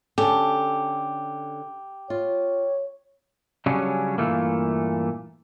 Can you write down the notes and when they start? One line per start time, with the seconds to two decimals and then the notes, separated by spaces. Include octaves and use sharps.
0.18 D3 C#4 G4 A4
2.10 F4 C#5
3.66 C#3 F#3 G3 C#4 D4
4.18 G2 A#2 E3 A3 A#3